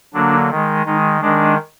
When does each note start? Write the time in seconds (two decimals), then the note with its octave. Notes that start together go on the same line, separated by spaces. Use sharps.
0.14 D3 F#3 A#3 D4
0.50 D#3 G#3
0.86 D#3 G#3 D#4
1.21 D#3 G#3 D4